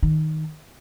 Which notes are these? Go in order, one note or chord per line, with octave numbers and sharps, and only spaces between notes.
D#3